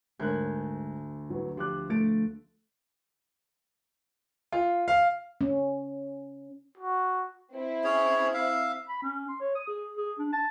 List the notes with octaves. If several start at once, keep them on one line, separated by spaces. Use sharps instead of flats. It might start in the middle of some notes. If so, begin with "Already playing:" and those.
D2 G#2 A#4 G#5 F#6 G6
F#3 B4
F3 G4 D6 F#6
A3 A6 D7
F4
F5
C#4
F#4
C4 E4
C#4 G#4 C#5
E5 F5
B5
C#4
C6
C#5
D#6
G#4
G#4
D4
A5